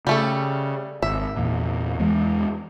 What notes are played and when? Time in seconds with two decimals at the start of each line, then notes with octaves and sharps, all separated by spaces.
0.07 C#3 G3 A3 A4
1.02 G#1 E5
1.36 E2 A#2
2.00 E2 E3 G#3